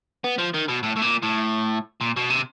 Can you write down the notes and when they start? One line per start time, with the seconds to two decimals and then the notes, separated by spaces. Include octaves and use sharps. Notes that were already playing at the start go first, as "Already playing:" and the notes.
0.24 B3
0.38 F3
0.54 D#3
0.68 B2
0.83 A2
0.96 A2
1.02 A#2
1.23 A2
2.01 A#2
2.17 B2
2.30 C3